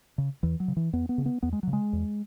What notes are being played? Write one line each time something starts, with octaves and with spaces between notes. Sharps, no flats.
C#3
E2 E3
F#3
C#3
E3
E2 B3
B3
C#3
B3
E2 B3
G#3
C#3 F#3
G#3
E2